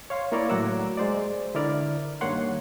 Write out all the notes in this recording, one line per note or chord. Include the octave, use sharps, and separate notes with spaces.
C#5 F5 C6
A#3 E4 A#4 C#5 D5
A2 F#3 F#5 A#5 D6 E6
G#3 C5 D5
D3 E4 A#4 D5 F6
G2 D#3 A#3 C#5 F#5 C6